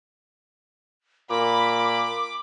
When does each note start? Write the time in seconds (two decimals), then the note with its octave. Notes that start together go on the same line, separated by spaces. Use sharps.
1.30 A#2 B5 D6